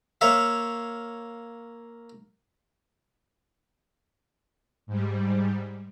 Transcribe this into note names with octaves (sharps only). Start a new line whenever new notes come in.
A#3 C#5 E5 F5
G#2 G3